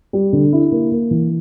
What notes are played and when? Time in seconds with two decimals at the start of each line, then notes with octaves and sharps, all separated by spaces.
0.13 G3
0.33 D3
0.53 E4
0.72 A#3
0.92 A#3
1.11 E3